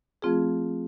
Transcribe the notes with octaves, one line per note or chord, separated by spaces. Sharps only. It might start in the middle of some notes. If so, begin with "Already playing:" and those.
F3 A3 C4 F4 G#4